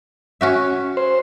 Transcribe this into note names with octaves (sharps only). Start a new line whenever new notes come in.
C#4 F#4 E5
C5